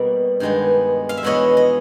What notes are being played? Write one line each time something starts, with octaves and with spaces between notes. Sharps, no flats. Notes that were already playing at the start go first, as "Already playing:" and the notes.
Already playing: B2 G3 A#3 D5
G2 D#3 G#3 B3
F5
E5
E2 B2 G#3 B3 C#5 D#5
D#5